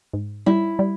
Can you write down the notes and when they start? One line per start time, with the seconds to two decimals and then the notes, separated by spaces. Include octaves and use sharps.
0.13 G#2
0.46 G3 E4
0.79 G3